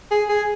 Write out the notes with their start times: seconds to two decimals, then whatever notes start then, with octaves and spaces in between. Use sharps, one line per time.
0.11 G#4
0.29 G#4